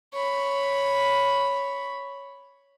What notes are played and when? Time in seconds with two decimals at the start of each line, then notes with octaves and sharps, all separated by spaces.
0.13 C#5 B5